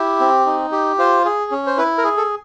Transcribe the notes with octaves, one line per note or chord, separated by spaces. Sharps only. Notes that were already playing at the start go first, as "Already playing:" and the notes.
Already playing: E4 G4
C4
D#4
G4
F4 C5
G#4
C#4
C5
E4 B4
A#4
G#4
A4